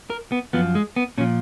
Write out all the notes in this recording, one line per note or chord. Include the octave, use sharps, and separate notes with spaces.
A#4
B3
F#2 F3 B3
G#3
B3
A#2 F3 C#4